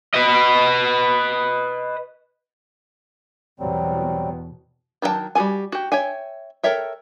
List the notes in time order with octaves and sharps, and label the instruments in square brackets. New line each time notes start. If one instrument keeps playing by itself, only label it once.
[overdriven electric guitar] B4 D#5
[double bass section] E2 B2 [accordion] F#3 G3 C4
[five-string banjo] D#3 F#3 F#4 G5 A5
G3 F#4 G#4 A4 G#5
F#4 G4
C#5 E5 G5 G#5
A4 A#4 C#5 E5 G5